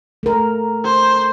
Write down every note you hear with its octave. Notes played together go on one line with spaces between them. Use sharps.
A3 A#4
C5